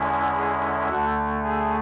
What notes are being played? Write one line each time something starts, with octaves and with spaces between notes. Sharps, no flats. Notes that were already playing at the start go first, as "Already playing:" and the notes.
Already playing: E2 D3 G#3 C#4 E4
G#4
D2 D3 A3 F#4
G#4